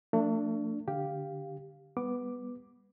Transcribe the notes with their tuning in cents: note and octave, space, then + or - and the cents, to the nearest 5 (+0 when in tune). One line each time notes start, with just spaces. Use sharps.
F3 +0 A3 +40 D4 +0
D3 +0 G4 +0 F5 +0
G3 +30 B3 +0 D6 +5